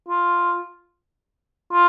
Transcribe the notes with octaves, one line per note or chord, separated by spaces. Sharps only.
F4
F4